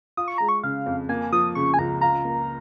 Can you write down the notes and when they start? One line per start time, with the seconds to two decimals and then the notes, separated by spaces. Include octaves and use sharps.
0.17 F4 D#6
0.28 C#6
0.38 G#3 A#5
0.49 C#6
0.64 C#3 F5
0.86 F2
1.09 A#3 G#5
1.32 F3 D#6
1.55 C#3 C#6
1.74 G#5
1.79 C#2 A#5
2.01 F4 A#5
2.25 A#3